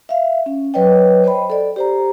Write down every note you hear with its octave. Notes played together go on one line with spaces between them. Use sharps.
E5 F5
C#4
F#3 B4 C#5 D#5 G5
C5 D#5 G5 B5
A4 D5
G4 C5 A#5